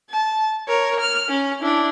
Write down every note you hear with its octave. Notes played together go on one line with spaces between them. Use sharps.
A5
A#4 C#5
F6
C#4
D4 E4